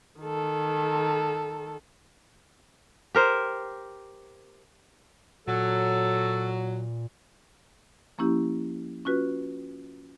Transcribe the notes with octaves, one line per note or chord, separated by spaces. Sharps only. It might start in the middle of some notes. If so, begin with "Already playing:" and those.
D#3 A4
G4 A#4 C5
A#2 F#3 A4
F3 A#3 C#4 E4 G4
C#4 F4 F#4 B4